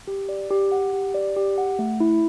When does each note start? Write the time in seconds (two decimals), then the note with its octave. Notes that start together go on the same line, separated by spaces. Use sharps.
0.08 G4
0.29 D5
0.51 G4
0.72 F#5
0.93 G4
1.14 D5
1.37 G4
1.58 F#5
1.79 A3
2.00 E4